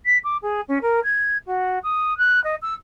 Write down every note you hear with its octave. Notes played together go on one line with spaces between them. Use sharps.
B6
D6
G#4
C#4
A#4
G#6
F#4
D#6
F#6
D#5
E6